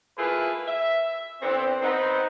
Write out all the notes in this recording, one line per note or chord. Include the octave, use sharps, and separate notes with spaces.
A3 A#3 E4 F4 G#4 B4
E5
D3 E3 B3 C4
B3 C4 D#4